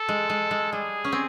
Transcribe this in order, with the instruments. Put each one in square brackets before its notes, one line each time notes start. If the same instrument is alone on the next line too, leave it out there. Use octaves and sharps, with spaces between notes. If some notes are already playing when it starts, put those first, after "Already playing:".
Already playing: [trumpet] A4
[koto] G#3
G#3
G#3
[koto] G3 [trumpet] G#4
[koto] C#4
C4